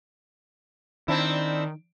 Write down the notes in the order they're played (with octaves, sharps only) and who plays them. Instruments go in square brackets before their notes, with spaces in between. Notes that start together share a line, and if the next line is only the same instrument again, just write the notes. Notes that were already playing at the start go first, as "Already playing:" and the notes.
[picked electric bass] D#3 [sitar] C4 D4 E4